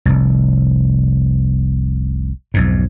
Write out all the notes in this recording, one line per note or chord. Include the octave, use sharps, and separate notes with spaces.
F1 C2
B1 F2 G#2